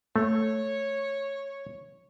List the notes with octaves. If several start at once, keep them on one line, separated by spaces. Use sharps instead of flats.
A3 C#5